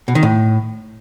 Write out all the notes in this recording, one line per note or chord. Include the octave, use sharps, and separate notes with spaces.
B2
D#3
A2